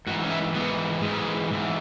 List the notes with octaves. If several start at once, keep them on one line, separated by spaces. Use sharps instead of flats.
G#2 E3 F#4
C#4
E4
G#2 E3 B3
G#2 E3 G#3
G#2 E3